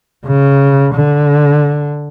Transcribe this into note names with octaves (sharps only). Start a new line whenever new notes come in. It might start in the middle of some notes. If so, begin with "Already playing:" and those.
C#3
D3